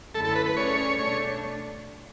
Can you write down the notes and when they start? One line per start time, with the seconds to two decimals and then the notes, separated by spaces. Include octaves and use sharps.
0.14 F#2 D3 A3 E4 A4
0.25 A4
0.35 B4
0.46 B4
0.56 A3 C#4 G#4 C#5 D5
0.99 B2 A3 D4 C#5